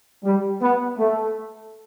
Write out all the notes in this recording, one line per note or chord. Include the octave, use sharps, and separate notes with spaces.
G3
B3
A3